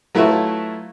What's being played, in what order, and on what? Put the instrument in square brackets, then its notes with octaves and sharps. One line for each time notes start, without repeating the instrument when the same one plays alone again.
[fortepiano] F#3 A3 E4 F4 B4 E5